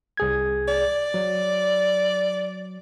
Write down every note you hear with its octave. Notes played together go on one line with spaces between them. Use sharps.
C2 G#4 G#6
D5
F#3